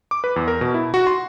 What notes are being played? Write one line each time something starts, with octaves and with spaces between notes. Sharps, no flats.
D6
B4
E2
A#4
B2
E4
F#4
C6